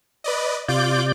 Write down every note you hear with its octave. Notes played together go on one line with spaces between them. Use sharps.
B4 D5 D#5
C3 F4 D5 D6 G6